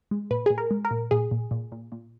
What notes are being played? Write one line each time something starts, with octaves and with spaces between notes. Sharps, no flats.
G#3
A#2 B4
A#2 G#4
A#4
G#3
A#4
A#2
A#2 G#4
A#2
A#2
A#2
A#2